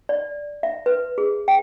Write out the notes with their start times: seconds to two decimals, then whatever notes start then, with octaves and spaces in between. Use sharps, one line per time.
0.09 D5
0.63 E5
0.86 B4
1.18 G#4
1.48 G5